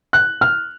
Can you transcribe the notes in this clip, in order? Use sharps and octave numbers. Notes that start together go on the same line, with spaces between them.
F#6
F6